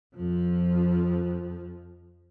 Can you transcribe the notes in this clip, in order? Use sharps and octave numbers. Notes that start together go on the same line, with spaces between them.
F2 F3